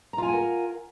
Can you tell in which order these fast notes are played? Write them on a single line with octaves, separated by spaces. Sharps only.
A#5 F4 G#5 F#5 A#4